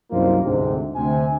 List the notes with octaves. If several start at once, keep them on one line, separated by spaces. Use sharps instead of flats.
C2 F#2 D#3 A#3 F4 C5
D2 G#2 C3
D2 C3 G#5